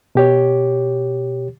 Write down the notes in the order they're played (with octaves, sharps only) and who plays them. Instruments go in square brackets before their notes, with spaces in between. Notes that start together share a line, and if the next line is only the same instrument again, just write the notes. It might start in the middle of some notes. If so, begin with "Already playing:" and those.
[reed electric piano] B2 G4 C#5